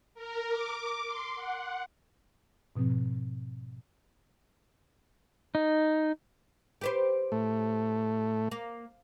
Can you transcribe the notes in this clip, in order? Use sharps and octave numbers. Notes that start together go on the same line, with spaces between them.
A#4
D6
C6
F#5
G#2 B2 F3 C4
D#4
G4 B4 C5
A2 A3
A#3